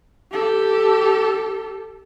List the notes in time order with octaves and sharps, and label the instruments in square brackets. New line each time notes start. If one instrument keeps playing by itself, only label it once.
[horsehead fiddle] G4 A4